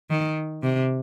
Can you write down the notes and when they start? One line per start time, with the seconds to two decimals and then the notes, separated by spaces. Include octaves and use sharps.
0.10 D#3
0.63 C3